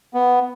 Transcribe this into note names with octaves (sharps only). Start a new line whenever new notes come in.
B3